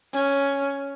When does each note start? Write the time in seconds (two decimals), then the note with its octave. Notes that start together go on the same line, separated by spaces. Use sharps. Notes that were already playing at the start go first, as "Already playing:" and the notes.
0.13 C#4